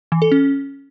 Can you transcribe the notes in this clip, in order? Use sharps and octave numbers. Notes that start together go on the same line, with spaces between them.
E3
A4
C#4